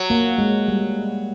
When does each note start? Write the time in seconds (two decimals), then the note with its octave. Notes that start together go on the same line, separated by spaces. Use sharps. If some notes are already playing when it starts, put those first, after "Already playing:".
Already playing: F#3
0.10 A#3
0.38 G#3
0.68 G3